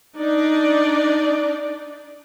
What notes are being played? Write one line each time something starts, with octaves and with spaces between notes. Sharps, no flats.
D4 D#4 D5